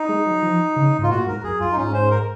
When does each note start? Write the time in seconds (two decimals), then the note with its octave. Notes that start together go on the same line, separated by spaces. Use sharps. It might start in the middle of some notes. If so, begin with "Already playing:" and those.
Already playing: D#4
0.09 G#3
0.26 F#3
0.42 F3
0.76 C#3
0.99 G#2 F4
1.10 A#2 F#4
1.27 G#2 A#4
1.44 F#2 G#4
1.60 F#2 F4
1.72 D#4
1.77 G#2 C#4
1.94 C5
2.11 A#4